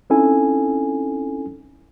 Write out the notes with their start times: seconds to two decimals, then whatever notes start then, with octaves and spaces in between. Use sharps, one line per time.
0.10 C4 C#4 D#4 E4 A4 G#5